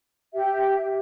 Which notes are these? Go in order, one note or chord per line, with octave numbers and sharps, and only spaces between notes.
G4 E5